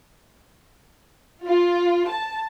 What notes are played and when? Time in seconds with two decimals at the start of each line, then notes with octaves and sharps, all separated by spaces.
1.45 F4
2.06 A5